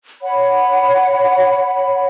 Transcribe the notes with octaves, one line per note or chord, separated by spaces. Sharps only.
C#5 F#5 B5